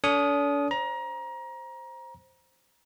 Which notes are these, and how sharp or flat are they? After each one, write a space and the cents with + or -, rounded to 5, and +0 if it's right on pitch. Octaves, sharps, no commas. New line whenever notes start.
D4 -45 A4 +20 D#6 +0
C5 +5 A#5 +25